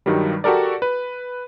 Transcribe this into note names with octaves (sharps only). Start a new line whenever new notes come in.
G2 D#3 F#3 G3
F#4 G4 A4 A#4 D5
B4